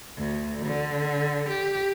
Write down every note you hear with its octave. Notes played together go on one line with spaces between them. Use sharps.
D2
D3
G4